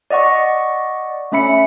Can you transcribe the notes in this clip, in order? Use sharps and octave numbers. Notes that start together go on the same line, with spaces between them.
D5 D#5 F#5 C#6
A3 C#4 E5 B5 C#7